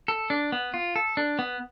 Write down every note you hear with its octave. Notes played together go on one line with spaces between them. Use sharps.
A4
D4
B3
F4
A4
D4
B3